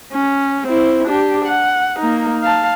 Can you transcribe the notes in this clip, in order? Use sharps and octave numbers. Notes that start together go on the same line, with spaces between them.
C#4
C4 E4
D4 G4
F#5
A#3 D#4
F5 A5